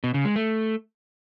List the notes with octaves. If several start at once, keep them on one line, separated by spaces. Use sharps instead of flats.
B2
C#3
G#3
A3